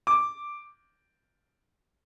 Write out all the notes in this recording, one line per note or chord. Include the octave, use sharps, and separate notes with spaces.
D6